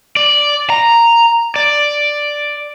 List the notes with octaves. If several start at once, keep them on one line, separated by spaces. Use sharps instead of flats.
D5
A#5
D5